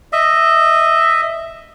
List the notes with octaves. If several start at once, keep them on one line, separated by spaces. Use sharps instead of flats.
D#5 E5